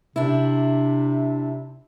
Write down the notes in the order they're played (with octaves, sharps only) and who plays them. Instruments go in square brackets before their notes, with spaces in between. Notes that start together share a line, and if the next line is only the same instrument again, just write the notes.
[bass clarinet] C3 [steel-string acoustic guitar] D4 E4